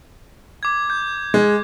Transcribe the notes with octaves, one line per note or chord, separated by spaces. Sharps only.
D6 G#6
G6
G#3